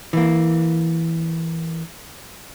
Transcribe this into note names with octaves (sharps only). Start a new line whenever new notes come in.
E3 A#3